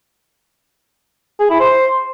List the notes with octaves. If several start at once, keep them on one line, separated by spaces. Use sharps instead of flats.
G#4
E4
C5